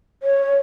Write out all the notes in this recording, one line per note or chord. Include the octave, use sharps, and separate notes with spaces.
C#5